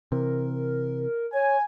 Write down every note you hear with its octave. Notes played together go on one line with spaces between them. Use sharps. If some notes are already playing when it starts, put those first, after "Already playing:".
C3 E3 A#4
C#5 G#5